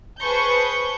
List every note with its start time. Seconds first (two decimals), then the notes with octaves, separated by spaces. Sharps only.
0.21 G#4 B4 C5 A5 C#6 G6